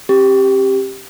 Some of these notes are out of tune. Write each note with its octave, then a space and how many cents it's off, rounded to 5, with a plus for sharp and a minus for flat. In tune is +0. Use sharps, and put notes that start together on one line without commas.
C4 +45 G4 +0